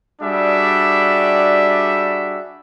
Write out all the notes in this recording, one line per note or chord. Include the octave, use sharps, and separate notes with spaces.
G3 D4 F#4 G#4 D5 E5